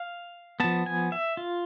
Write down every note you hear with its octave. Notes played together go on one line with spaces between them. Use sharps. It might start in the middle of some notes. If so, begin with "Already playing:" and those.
Already playing: F5
F3 B3 A5
G#5
E5
F4